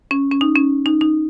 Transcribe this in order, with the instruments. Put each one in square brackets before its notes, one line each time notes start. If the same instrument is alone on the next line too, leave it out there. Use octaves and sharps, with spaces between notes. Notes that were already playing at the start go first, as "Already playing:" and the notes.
[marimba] C#4
C#4
D#4
C#4
D#4
D#4